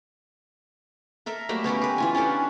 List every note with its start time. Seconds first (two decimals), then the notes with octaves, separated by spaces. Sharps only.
1.26 A4 A#4 E5
1.49 F#3 G3 A3 A#3
1.64 B3 C#4 G4 A#4
1.81 G4 B4
1.98 E3 F4 G#5
2.15 C#4 D4 G4 A4